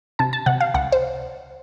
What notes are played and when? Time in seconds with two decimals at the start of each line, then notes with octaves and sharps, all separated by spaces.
0.19 C3 A5
0.33 A5
0.46 C3 F#5
0.60 F5
0.74 C#2 F#5
0.92 C5